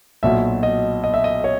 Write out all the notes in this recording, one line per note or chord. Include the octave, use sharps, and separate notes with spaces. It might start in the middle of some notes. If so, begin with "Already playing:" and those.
B1 A#2 F#3 E5
D#5
D#5
E5
D#5
C#5